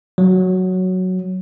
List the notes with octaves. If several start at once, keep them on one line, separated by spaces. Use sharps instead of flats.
F#3